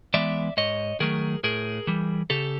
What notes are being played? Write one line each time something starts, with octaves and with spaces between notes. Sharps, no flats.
E3 G#3 B3 D5 E5
G#2 C#5 D#5
D#3 F#3 A3 G#4 A#4
A2 G#4 A#4
E3 G3
C#3 G4 A4